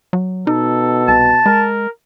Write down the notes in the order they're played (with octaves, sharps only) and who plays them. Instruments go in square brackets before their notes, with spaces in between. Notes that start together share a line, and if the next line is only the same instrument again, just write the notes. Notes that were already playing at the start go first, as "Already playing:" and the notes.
[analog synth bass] F#3
[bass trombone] B2 [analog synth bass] D#4 [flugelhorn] A4
[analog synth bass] C2 [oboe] A5
[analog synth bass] G#3 [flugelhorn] A#4